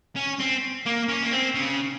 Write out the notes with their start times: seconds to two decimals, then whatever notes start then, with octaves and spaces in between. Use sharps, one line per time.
0.16 C#4
0.39 C4
0.86 A#3
1.09 C#4
1.23 A#3
1.32 C4
1.55 C#3